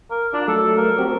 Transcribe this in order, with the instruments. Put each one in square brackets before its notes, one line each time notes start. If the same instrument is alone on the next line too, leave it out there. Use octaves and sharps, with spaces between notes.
[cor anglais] A#4
[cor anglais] D4 [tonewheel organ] F4
[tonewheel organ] F#3 A3 [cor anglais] A4
[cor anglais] A#4
[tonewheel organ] C4 F#4 G4